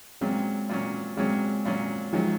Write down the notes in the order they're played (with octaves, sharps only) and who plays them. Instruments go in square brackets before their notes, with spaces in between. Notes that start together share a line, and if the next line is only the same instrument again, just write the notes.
[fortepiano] A#2 F#3 C#4 [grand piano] G#3 C4
[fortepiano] A#2 F#3 C#4
[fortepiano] A#2 F#3 C#4 [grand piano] G#3 C4
[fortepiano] A#2 F#3 C#4
[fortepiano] D#3 F#3 C#4 [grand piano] F3 G#3